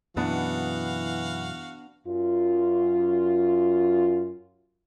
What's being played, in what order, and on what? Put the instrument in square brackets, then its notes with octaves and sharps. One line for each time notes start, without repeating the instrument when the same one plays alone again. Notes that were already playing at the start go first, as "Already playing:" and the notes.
[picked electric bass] F#2 B2 [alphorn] E3 [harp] B3 D4 D#6 [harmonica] F#4 F5
[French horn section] F#2 F4